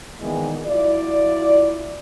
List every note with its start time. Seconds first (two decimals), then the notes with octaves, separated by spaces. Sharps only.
0.21 A#2 D#3 E3 G#3 B3
0.66 F#3 E4 F4 D5